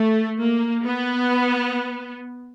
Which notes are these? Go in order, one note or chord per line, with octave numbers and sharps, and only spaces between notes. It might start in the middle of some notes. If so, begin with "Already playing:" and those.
Already playing: A3
A#3
B3